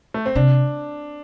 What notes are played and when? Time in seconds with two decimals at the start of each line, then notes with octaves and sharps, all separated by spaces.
0.14 A3
0.26 C4
0.35 C3 D4